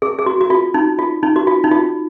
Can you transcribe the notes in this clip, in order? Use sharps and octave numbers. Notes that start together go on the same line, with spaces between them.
G#4
G#4
F#4
F#4
F4
D#4
F4
D#4
F#4
F4
D#4
F4